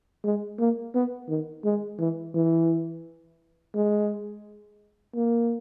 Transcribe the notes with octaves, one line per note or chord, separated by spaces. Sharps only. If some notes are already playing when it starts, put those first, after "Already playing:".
G#3
A#3
B3
D#3
G#3
E3
E3
G#3
A#3